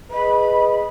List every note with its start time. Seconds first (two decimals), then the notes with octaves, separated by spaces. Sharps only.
0.10 G#4 B4 D#5 B5